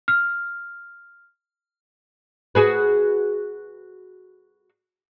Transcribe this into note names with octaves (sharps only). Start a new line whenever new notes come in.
F6
F#4 G#4 B4